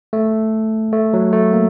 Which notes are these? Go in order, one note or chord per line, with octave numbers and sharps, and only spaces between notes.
A3
A3
F#3
A3
A#3